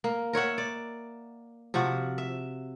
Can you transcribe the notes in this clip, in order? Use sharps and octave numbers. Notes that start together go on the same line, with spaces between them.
A#3
A#4 C#5 E5 F#5
D5
C3 F3 F#4 F#5
E5